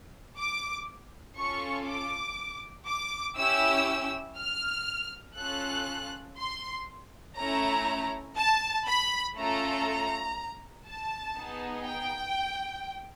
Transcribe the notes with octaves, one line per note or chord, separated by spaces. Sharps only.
D6
C#4 F4 A4 C#6
D6
D6
C#4 E4 G4 E6
F6
C#4 F4 A4 F#6
C6
A3 C#4 E4 A#5
A5
B5
A3 C#4 F4 A4 A#5
A5
B3 D#4 G#4
G5